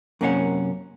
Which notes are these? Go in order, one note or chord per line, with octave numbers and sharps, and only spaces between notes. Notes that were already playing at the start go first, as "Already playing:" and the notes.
F#2 C3 A#3 C#4 F4 F#5